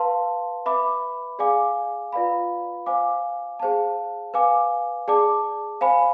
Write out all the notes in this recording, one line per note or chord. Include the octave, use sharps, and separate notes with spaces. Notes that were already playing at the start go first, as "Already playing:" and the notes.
Already playing: B4 F5 A5 C6
B4 E5 B5 D6
G#4 D5 F5 G#5 D6
F4 B4 D5 F5 B5
C5 F5 G#5 D6
G#4 C5 F5 A5
B4 F5 G#5 D6
G#4 D5 A5 D6
C5 F5 G#5 B5